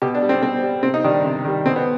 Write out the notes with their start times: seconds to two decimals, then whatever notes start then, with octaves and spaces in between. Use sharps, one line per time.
0.02 B2 G4
0.14 D4
0.22 G3
0.29 C4
0.42 B2 C4
0.63 G3
0.83 C3 C4
0.94 D#4
1.04 D#3 G3 D4
1.15 D4
1.24 C3
1.45 D#3 G3
1.66 B2 C4
1.76 B3